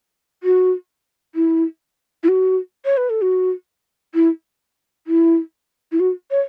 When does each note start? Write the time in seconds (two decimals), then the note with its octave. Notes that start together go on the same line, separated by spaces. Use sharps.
0.43 F#4
1.35 E4
2.23 E4
2.28 F#4
2.85 C#5
2.97 B4
3.10 A4
3.22 F#4
4.14 E4
5.07 E4
5.92 E4
6.00 F#4
6.31 C#5